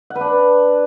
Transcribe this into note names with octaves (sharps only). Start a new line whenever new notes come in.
F#5
B4
D4